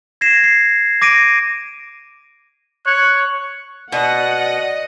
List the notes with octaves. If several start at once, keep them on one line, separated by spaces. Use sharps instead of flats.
G#6 A#6 C7 E7
C7
D6 A#6 D7 D#7
C#5 F#6
B2 D5 D#5 F#5